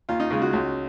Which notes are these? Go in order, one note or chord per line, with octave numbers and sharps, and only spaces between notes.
D#2 F4
D#4
C#3 G#3 F4
F#4
C#2